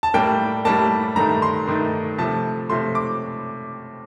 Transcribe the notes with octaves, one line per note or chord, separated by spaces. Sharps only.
A5
A2 G3 A#3 G5
A2 G3 A#3 A5
G2 D#3 A3 A#5
C6
G2 D#3 A3
C3 F3 A3 A5
C3 F3 A3 C6
D6